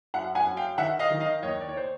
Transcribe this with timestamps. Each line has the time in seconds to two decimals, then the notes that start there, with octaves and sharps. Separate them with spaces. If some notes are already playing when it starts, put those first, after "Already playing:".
0.14 F#2 E5 F#5
0.35 F#5 G#5
0.46 F#2
0.57 F5 G5
0.78 D#3 E5 F#5
0.99 D#5 F5
1.10 D#3
1.20 D#5 F5
1.42 D#2 C#5 D#5
1.60 D5
1.69 C#5
1.77 C5